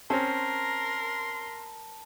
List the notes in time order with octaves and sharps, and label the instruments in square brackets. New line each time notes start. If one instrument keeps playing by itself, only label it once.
[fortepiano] C4 C#4 [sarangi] A#4 [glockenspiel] A5 [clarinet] C6